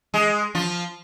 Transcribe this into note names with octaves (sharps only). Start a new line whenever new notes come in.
G#3 G#4
F3 F4